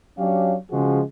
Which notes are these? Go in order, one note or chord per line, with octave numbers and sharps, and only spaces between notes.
F#3 C#4 D4 G4 C#5 F5
C#3 F3 G#3 F#4 G#4